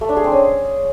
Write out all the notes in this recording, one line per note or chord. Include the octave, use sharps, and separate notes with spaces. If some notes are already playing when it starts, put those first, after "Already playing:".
A3
D4
G#4
C4
C#4